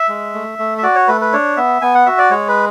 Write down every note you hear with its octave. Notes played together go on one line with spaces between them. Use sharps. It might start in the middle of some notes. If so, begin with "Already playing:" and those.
Already playing: E5
G#3
A3
A3
E5
F#4 D5
C#5
A3 B4
B4
D4 C#5
B3 E5
B3 G#5
F#5
F#4 E5
D5
G#3 C#5
B4